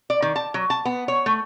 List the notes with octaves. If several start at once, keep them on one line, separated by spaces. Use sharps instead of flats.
D5
D#3
A5
F#3
A5
B3
C#5
A3